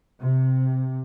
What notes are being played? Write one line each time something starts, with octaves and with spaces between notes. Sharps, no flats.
C3